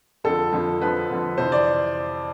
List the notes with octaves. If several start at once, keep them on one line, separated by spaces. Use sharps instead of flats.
F2 D3 F3 A4
F2 D3 F3
F2 D3 F3 B4
F2 D3 F3
F2 C3 E3 C5
D5